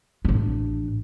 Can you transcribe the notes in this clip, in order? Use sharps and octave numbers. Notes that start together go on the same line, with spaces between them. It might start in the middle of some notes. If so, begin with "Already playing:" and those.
A1 D4